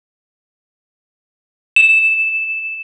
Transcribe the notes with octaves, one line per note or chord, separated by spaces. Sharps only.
E7